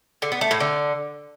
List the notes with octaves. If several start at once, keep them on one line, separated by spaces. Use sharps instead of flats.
D3
B3
A3
A2
D3